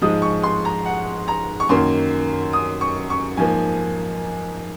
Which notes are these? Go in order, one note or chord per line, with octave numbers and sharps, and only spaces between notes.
G#2 F3 G#3 D#6
C#6
C6
A#5
F#5
A#5
C#6
F#2 D#3 A#3 C6
D#6
C#6
C#6
G#2 F3 A#3 G#5